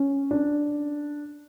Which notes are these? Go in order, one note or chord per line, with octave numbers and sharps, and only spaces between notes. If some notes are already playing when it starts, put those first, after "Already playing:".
Already playing: C#4
D4